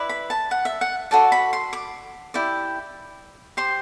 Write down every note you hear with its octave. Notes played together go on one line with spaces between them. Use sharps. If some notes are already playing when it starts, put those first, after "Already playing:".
Already playing: E4 B4 D5
B5
A5
F#5
E5
F#5
F#4 A4 D5 A5
B5
C6
D6
E4 G4 D5
G4 C5 C6